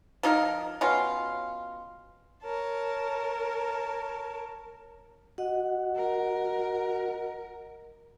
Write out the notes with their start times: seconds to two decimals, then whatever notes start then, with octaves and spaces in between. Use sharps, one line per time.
0.23 F3 D#4 G#4 A#4
0.81 B2 C#4 F4
2.44 A#4 C#5 A5
5.38 F#4 D#5 F#5
5.96 A#4